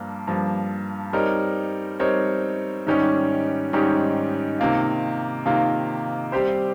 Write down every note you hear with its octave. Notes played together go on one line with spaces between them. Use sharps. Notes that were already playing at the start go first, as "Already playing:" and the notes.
Already playing: G2 F3 A#3
G2 F3 A#3
G3 C4 D#4 A#4 C#5
G3 C4 D#4 A#4 C#5
G#2 D#3 G3 C#4 G4
G#2 D#3 G3 C#4 G4
C3 D#3 A#3 F4
C3 D#3 A#3 F4
G3 C4 G4 C5